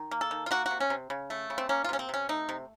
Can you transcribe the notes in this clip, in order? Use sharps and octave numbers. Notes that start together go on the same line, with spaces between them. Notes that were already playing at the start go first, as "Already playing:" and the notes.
Already playing: D#3
A#3
A4
D#3
F4
A#3 F#4
F#4
C3
C#4
C3
C#3
A3
C#3
C4
A#3 C#4
F4
C3 C#4
C4
C3 C#4
A3 D#4
C3